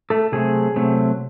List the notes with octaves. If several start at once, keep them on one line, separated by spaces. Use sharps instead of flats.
A3 A4
C3 F#3 A3 C4 G#4
C3 F#3 A3 C4